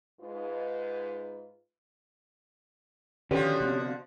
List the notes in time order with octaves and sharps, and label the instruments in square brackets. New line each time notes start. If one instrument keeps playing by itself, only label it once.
[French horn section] G#2 F4 B4
[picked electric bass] B2 D#3 [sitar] D3 F3 F#4 [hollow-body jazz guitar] C#4 G4 B4
[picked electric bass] C3 B3 C4